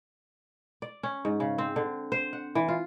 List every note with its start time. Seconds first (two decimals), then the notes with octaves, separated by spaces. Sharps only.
0.82 D5
1.03 C#4
1.25 G#2
1.40 C#3
1.58 C4
1.76 D3
2.12 C5
2.33 F#5
2.55 E3
2.68 F4